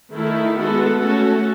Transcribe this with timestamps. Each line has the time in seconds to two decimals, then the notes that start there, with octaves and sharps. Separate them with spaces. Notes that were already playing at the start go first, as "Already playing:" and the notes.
0.13 D#3 A3 E4 A4
0.56 G#3 B3 F#4 A4
1.00 A3 C#4 F#4 A4